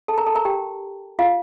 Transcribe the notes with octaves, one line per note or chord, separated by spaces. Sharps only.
A4 A5
A#4 A#5
A4 A5
A#4 A#5
G4 G5
F4 F5